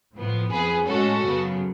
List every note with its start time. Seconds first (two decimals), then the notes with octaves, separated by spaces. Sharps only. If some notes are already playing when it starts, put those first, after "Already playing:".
0.14 A2 F3 B3
0.50 F2 F3 B3 G#4 B4
0.86 A2 G#3 C#4 F#4 A4
1.22 F#2 C#3 F#3 B3